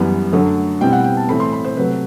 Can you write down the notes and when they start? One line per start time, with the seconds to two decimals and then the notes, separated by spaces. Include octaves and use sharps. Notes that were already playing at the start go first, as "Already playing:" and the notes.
Already playing: F#2 E3 G3 B3
0.33 F#2 D3 F#3 A3
0.80 B2 G3 C4 E4 G5
0.93 F#5
1.04 G5
1.17 A5
1.28 A2 E3 A3 C4 B5
1.40 C6
1.52 B5
1.64 C5
1.77 C3 F#3 A3 B4